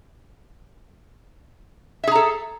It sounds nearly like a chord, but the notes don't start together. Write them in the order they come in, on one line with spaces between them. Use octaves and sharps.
E5 G#4 A#5 A4